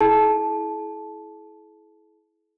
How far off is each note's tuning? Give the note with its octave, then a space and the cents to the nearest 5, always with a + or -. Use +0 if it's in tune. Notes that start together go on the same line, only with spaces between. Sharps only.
E4 -10 G#4 +40 A5 -10